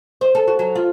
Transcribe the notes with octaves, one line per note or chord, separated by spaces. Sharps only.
C5
A4
F#4
F#3
F4